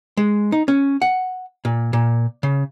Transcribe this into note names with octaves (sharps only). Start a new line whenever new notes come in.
G#3
D#4
C#4
F#5
A#2
A#2
C#3